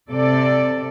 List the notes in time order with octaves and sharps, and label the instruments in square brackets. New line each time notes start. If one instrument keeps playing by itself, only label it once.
[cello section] C3 A4 D5